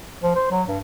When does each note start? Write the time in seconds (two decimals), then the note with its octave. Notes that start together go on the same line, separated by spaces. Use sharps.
0.23 F3
0.35 C5
0.51 F#3
0.68 G2